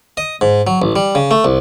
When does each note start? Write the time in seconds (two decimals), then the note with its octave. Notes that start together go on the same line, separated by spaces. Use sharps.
0.17 D#5
0.41 G#2
0.67 F#3
0.82 A1
0.96 G3
1.15 C#3
1.31 A3
1.45 C2